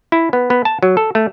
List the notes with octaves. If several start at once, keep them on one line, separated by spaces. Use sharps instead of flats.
E4
B3
B3
A5
F#3
A4
A3